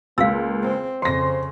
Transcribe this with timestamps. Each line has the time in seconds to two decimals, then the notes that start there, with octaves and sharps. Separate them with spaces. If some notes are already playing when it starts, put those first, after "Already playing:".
0.18 C#2 A#3 F5 E6
0.62 C4
1.02 F2 C#3 C5 C6 A#6